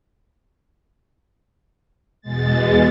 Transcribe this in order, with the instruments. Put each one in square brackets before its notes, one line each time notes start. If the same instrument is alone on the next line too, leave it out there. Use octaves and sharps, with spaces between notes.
[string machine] E2 B2 G#3 A6